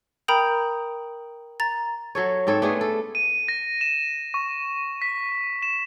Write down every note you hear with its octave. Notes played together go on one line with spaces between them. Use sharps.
A#4 G5 A#5 B5 D#6 G6
A#5 A6
F#3 A4 C#5
G#2 C4 A4 C#5
A3 B3 D4 G#4
A4
D#7
A#6
E7
C#6
B6
E7